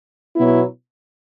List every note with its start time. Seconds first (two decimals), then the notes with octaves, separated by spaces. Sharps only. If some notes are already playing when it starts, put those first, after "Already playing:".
0.36 B2 F#3 B3 E4